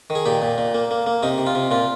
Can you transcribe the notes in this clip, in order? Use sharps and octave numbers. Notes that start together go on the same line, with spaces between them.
D#3
G#4
A#2 G4
A#2
A#2
A#3
A#3
A#3
C3 D#4
C3
F4
C3
A#2 F4